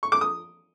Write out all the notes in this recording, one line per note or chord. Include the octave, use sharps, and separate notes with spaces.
C#6
D6
D#6